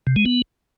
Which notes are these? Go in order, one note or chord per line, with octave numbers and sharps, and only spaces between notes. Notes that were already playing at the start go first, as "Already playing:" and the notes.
C3
G#3
B3